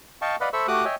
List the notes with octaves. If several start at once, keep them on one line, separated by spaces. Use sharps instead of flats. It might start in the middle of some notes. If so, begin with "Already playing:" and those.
D#5 F5 G5 A5 C#6
B4 D5 D#5 F5 F#5 B5
A4 C5 E5 B5 C#6 E6
A3 F#4 G4 D6 D#6 F#6
C#5 D#5 E5 G5 G#5